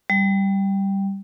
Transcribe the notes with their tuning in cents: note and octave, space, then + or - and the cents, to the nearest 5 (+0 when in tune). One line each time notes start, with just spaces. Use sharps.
G3 +0 G5 +0